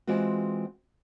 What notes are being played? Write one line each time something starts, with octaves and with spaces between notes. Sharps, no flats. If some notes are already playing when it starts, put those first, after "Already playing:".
E3 G#3 C4 F4 F#4